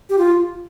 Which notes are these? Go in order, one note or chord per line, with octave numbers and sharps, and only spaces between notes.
G4
F4